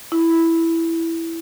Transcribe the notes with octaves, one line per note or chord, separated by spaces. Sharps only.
E4